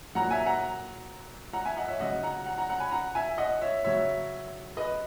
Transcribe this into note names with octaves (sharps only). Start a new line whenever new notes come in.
A#2 F#3 F#5 A#5
E5 G#5
F#5 A#5
F#5 A#5
E5 G#5
D#5 F#5
C#5 E5
C#3 F#3 D#5 F#5
F#5 A#5
F#5 A#5
F#5 A#5
F#5 A#5
G#5 B5
F#5 A#5
E5 G#5
D#5 F#5
C#5 E5
C#3 F#3 C#5 E5
B4 D#5